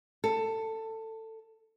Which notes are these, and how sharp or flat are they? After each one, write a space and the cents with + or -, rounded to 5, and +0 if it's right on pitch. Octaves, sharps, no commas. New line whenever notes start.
A4 +15